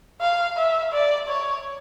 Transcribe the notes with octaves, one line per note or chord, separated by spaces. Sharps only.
F5
E5
D5
C#5